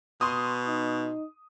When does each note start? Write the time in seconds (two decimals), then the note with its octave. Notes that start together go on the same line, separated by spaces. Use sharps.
0.21 B2 C6 D#6
0.66 D#4